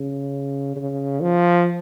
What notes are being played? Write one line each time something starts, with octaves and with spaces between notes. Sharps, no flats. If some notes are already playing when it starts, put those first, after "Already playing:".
Already playing: C#3
C#3
F3